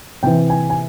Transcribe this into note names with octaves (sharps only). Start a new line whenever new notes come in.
C3 E3 G5
G#5
G#5